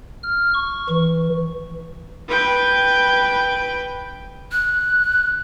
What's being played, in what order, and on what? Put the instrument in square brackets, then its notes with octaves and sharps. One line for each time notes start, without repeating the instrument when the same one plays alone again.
[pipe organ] F6
C#6
E3
[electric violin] B4 G5
[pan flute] F#6